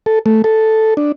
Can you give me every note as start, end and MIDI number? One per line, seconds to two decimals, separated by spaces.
0.06 0.19 69
0.26 0.42 57
0.44 0.94 69
0.97 1.12 62